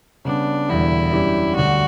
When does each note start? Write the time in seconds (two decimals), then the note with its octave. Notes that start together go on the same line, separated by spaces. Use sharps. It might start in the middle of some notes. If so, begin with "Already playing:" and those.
0.25 C#3 G3 B3 D4
0.69 E1 E2 D3 G3 E4
1.12 F#2 E3 G3 D4 G4
1.55 D2 D3 G3 F#4